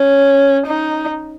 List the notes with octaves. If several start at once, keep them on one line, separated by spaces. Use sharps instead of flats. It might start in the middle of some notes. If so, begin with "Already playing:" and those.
Already playing: C#4
D#4